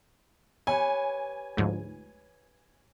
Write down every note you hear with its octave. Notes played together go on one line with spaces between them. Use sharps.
G4 B4 C#5 G#5
D2 G#2 F3